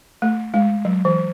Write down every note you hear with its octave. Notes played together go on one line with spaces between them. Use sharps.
A3
G#3
F#3
E3